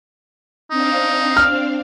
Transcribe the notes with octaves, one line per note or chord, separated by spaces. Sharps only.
C4 D4 D#4 F5
F6